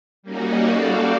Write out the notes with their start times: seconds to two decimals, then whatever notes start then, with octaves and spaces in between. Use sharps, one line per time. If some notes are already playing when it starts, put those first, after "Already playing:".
0.23 G3 A#3 C#4 D#4 F#4
0.69 G3 F#4 G4 A4 D5 F5